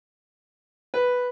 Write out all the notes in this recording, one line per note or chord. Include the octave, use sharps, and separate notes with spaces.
B4